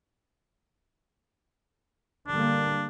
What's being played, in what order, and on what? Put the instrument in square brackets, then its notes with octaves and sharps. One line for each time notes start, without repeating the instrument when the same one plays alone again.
[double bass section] D3 G3 A#3 [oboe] D4